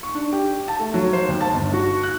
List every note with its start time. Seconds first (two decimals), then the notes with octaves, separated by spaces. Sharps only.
0.03 C#6
0.15 D4
0.33 G4
0.68 A5
0.79 A3
0.94 F#3
1.13 C5
1.28 D#2
1.41 A5
1.54 G1
1.74 F#4
2.03 F#6